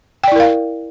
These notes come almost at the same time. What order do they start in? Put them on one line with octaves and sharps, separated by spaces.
G5 D5 E4 A#4 F5